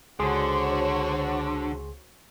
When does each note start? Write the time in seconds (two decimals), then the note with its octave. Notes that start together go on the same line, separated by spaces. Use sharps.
0.20 C#2 D3 F#4 G#4 C5 C#5 C6